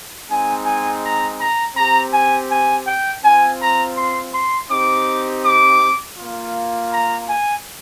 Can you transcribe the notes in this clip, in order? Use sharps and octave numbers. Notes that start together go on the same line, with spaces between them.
G#3 C4 D#4 G#5
G#5
A#5
A#5
C4 G4 A#5
G#5
G#5
G5
C4 F4 G#5
A#5
C6
C6
C4 D#4 G4 D6
D6
A#3 F4
A#5
G#5